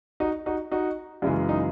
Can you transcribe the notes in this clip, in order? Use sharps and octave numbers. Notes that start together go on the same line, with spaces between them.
D#4 F#4
D#4 F#4
D#4 F#4
F#2 C#3 E3 G#3 E4
D#4